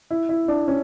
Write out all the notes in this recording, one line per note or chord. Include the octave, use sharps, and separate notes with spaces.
E4
E4
D4
C#4